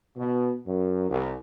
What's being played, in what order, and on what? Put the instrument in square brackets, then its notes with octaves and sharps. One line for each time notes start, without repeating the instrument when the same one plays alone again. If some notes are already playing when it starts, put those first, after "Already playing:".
[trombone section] B2
F#2
C2